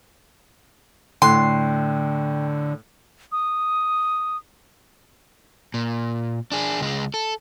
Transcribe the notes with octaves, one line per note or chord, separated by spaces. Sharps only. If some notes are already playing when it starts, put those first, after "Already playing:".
A2 D3 G5 C6 F#6
D#6
A#2
D4 G#4
C#2 G#3
A4